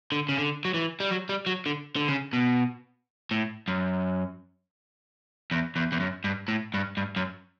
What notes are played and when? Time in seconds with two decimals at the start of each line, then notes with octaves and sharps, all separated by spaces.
0.12 D3
0.29 C#3
0.37 D3
0.65 F#3
0.74 E3
1.00 G3
1.10 F#3
1.29 G3
1.47 F#3
1.66 D3
1.96 D3
2.08 C#3
2.33 B2
3.31 A2
3.68 F#2
5.51 E2
5.76 E2
5.92 E2
6.00 F#2
6.24 G2
6.48 A2
6.74 G2
6.97 G2
7.16 F#2